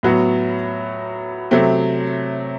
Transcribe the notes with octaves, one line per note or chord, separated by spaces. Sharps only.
A2 F#3 B3 F#4
C3 F#3 A3 C4